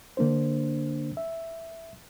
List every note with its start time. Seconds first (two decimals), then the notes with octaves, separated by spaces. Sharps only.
0.17 D3 A#3 D4 C5
1.17 E5